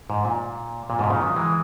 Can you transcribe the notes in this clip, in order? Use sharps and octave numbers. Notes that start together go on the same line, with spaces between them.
G#2
A#2
A#2
G#2 B2
A#2 C#3
D#3 F#3
E3 G#3